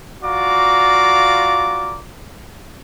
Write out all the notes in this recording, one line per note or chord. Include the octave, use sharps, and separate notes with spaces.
F4 F#4 D5 F5 A#5 D6